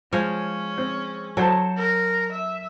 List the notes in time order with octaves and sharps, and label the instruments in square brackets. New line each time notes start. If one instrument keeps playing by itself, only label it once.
[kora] F3 G#3 C#5 [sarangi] C#4
[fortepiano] C4
[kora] F#3 [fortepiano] A4 C5 A5
[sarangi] A#4
E5